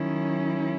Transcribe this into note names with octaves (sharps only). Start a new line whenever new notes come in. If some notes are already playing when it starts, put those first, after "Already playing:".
Already playing: D#3 F#3 C#4 E4